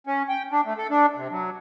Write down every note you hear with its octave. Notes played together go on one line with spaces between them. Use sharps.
C#4
G5
D4
A3
A4
D4
C3
F#3